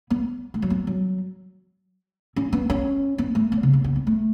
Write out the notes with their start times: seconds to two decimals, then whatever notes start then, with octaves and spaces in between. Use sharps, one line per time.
0.10 B3
0.54 A3
0.62 F#3
0.70 B3
0.87 F#3
2.36 C#4
2.52 B3
2.70 C#4
3.18 B3
3.35 A3
3.52 B3
3.63 C#3
3.73 B3
3.84 B3
3.96 B3
4.07 A3